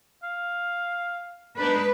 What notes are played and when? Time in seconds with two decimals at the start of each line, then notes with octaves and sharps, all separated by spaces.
0.23 F5
1.59 G#3 B3 D4 D#4 B4